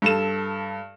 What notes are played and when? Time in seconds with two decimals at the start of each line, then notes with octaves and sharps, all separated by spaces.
0.02 G2 A4 E7